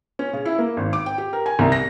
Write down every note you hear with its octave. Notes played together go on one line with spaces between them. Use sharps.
C#4
C#3
E4
A#3
G#1
D6
G5
G4
A#4
G#5
C2
A#6